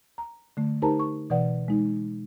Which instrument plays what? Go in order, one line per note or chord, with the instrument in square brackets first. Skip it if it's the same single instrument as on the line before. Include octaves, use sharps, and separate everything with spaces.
[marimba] A#5
D3 A3
D#4 G4 A#4 C5 A5 A#5
C#6
B2 E3 B4 D5 F#5
G#3 D#4